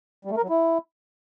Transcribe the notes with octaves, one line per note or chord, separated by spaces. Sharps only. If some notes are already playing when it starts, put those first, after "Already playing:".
G3
A3
A#4
F#3
E4